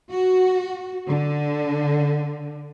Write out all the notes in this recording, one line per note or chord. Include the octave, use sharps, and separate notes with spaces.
F#4
D3